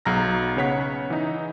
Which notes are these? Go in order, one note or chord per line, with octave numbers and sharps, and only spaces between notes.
B1 F#3 G#4 A#5 F6 A#6
C#3 B3 C#5 F#5 B6
E3 D#4